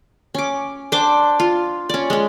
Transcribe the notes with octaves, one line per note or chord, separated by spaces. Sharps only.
C#4 D6
D4 C5 G5 D6
F4
C#4 D5
G#3 C#4